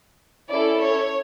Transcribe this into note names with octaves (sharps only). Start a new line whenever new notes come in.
C#4 E4 A4 D5
C#5